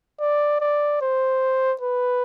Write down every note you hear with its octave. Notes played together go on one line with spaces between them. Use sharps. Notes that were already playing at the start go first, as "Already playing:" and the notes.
D5
D5
C5
B4